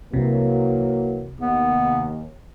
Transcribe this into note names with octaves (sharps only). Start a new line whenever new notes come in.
C2 C3 E3 F#3 A#3
D#2 B3